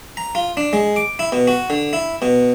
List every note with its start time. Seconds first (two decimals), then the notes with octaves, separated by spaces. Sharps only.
0.17 A#5
0.35 F4
0.57 D4
0.73 G#3
0.96 D6
1.19 E4
1.32 B2
1.48 F#4
1.70 D3
1.93 E4
2.22 B2